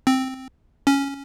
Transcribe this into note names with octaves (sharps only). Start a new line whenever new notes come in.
C4
C#4